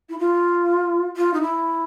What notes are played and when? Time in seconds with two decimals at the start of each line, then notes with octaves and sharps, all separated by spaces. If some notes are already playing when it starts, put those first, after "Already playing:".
0.09 E4
0.19 F4
1.17 F4
1.34 D#4
1.41 E4